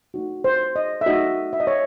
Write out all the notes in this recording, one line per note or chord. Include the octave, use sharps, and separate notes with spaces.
A3 D#4 F#4
C5
D#5
E5
A3 D#4 F#4 D#5
E5
D#5
C#5